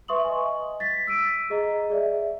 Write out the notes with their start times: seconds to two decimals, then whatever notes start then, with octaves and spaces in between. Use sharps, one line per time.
0.08 B4 E5 C6 C#6 D#6 F#7
0.24 D#5 G#5
0.80 A6 B6
1.07 E6 B6 D7 D#7
1.50 G#4 D#5 A#5
1.90 G#4 D5 E5